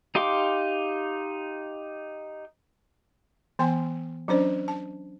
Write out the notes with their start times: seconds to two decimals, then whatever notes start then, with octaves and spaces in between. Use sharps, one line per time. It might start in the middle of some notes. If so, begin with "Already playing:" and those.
0.15 D#4 G4 F5 C6 D6
3.59 E3 B3 G5 G#5 C6
4.28 F#3 C#4 D4 C5 D5
4.68 A5